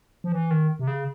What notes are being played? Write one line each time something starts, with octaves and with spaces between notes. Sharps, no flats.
F3
E3
D#3
C3
C#3